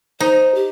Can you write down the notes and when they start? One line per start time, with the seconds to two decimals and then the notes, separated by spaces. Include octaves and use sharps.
0.20 D#4 C5
0.55 G4